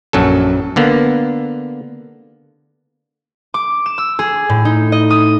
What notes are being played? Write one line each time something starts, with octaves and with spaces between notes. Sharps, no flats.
A#1 F#2 F#3 A4
D3 A#3 B3
D6
E7
E6
G#4
A2
D#4
D#5
D#6